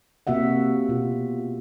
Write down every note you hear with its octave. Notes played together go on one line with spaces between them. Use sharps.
C3 A#3 F#4 E5 F#5
B2 F4